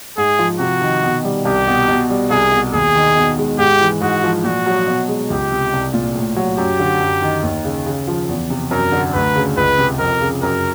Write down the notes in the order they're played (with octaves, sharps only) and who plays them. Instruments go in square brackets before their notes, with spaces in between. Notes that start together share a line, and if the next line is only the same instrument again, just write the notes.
[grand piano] G#2 [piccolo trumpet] G#4
[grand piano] F3
[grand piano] C3 [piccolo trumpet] F#4
[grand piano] D#3
B2
G3
[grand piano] C2 [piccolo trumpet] G4
[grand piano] B2
B2
G3
[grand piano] C2 [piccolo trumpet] G#4
[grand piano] B2
[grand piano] D#2 [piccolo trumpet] G#4
[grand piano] D#3
B2
G#3
[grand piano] G#2 [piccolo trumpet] G4
[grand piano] E3
[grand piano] G#2 [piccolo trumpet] F#4
[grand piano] F3
[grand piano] A#2 [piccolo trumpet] F#4
[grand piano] F#3
B2
G#3
[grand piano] C#2 [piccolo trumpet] G4
[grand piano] C3
C2
A#2
A2
F#3
[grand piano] F#2 [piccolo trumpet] G4
[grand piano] D3
F#2
D#3
D#2
C#3
C#3
F3
E2
C3
[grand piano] F#2 [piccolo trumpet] A#4
[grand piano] D3
[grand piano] D2 [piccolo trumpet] B4
[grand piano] C#3
[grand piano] C#2 [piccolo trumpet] B4
[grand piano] C3
[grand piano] F2 [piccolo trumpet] A#4
[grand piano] C#3
[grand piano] F#2 [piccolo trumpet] A#4